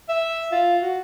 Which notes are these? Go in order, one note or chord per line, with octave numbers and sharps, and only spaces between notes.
E5
F4
F#4